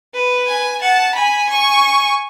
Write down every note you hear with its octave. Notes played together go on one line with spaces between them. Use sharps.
B4
G#5
F#5 A5
G#5 B5
C#6